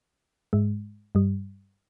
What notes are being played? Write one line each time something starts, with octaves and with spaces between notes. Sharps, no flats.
G#2 G#3
G2 G3